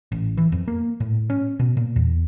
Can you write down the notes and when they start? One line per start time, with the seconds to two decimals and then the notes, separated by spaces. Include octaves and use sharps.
0.12 A1
0.37 E3
0.52 F2
0.68 A#3
1.00 A2
1.30 C#4
1.59 B2
1.77 A#2
1.96 E2